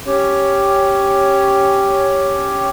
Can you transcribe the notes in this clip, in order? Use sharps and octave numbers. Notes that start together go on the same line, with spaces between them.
C#4 G4 C#5